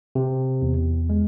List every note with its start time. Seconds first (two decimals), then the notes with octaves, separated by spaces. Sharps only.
0.15 C3
0.62 E2
1.10 G#3